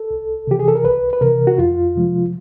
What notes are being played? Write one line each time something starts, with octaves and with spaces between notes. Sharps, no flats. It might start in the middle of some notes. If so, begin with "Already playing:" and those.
Already playing: A4
C2
C3 E3 G4
G#4
A4
A#4
C2 B4
B4
C3 E3 A#4
F#4
F2 F4
C3 F3 G#3